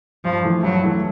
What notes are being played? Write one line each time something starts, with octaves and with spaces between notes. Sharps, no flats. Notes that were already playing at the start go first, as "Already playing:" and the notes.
G2 F3
E3 A3
G2 F#3
E3 A3